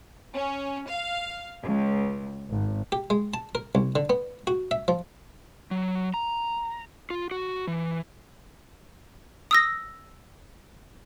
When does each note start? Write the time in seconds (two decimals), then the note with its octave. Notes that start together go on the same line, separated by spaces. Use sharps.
0.34 C#4
0.87 F5
1.64 C#2
2.48 G#1
2.92 G4
3.10 G#3
3.34 A5
3.55 A#4
3.75 C2
3.95 D3
4.10 B3
4.47 F#4
4.71 E5
4.88 F3
5.71 F#3
6.14 A#5
7.10 F4
7.31 F#4
7.67 E3
9.51 D#6 E6 A#6